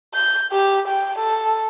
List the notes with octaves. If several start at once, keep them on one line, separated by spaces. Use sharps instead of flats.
G6
G4
G5
A4